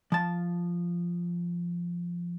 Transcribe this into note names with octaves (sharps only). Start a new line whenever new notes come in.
F3 A5